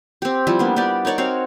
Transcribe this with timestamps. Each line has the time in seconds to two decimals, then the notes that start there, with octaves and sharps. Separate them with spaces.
0.22 C4 G4
0.47 F3 G3 E4
0.59 A#3 B3 D4
0.76 B3 D4 G4 D5
1.05 D#4 A#4 C#5 D5
1.18 C4 F#4 C#5 F5